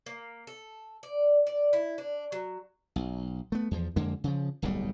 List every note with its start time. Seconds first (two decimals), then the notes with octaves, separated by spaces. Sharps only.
0.06 A#3
0.47 A4
1.03 D5
1.47 D5
1.73 E4
1.98 D4
2.32 F#3
2.96 B1
3.52 A3 B3
3.71 E2 F3
3.96 F2 D3 G#3 A#3
4.24 C#3 F3
4.62 D1 B1 G#2 G3